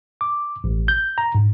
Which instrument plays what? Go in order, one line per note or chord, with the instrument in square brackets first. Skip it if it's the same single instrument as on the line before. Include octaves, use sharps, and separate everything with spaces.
[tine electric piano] D6
A1
G6
A#5
G#2